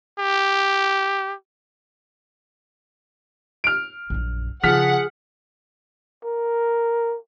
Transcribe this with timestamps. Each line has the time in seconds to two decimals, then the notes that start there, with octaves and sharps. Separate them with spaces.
0.19 G4
3.64 F6 D7
4.10 A#1 F#2
4.63 C#3 F3 G#4 F#5 F6 B6
6.25 A#4